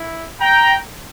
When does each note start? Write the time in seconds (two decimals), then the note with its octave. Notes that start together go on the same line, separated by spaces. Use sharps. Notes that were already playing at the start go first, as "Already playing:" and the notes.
Already playing: E4
0.40 G5 A#5